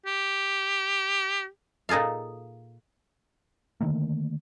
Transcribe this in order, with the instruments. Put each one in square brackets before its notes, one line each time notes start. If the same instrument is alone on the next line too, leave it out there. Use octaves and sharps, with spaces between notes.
[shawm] G4
[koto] A#2 D#4 G#4 A4 F5
[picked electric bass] D3 D#3 A3 A#3